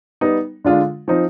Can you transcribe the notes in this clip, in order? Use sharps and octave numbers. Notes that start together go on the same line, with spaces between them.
G3 B3 D#4
D3 G#3 D4 F4
F3 C4 D#4